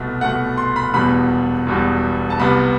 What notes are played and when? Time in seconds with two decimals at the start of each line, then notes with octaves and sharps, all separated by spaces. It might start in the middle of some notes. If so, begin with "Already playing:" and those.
Already playing: C2 B2 A3
0.21 C2 B2 A3 F#5
0.58 C6
0.76 B5
0.94 E1 E2 B2 G3 B5
1.67 E1 E2 B2 G3
2.30 A5
2.39 C2 C3 G3 B3 B5